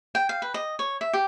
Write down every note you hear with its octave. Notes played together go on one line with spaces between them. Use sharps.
G5
F5
B4
D#5
C#5
E5
G4